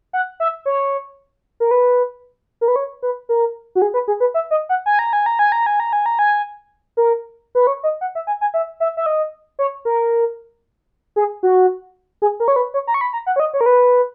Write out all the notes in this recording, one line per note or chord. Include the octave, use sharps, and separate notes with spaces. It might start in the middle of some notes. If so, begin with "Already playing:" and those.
F#5
E5
C#5
A#4
B4
A#4
B4
C#5
B4
A#4
F#4
G#4
B4
G#4
B4
E5
D#5
F#5
G#5
A#5
G#5
A#5
G#5
A#5
G#5
A#5
G#5
A#5
G#5
A#4
B4
C#5
D#5
F#5
E5
G#5
G#5
E5
E5
E5
D#5
C#5
A#4
G#4
F#4
G#4
A#4
C#5
B4
C#5
A#5
C#6
B5
A#5
F#5
C#5
D#5
C#5
A#4
B4